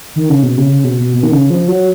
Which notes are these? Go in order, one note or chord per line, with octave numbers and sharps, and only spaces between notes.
D#3
C#3
B2
C#3
C#3
B2
B2
B2
D#3
C#3
F3
F#3